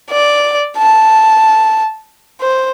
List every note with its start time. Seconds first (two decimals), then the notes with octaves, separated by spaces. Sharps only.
0.10 D5
0.77 A5
2.41 C5